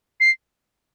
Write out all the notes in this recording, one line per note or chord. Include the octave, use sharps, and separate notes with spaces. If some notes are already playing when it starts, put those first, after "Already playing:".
C7